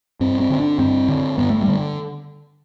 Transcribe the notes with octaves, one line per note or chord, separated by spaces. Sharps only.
G2 C4
C4
D3
D4
G2 C4
D3
G2 B3
A3
G3
D3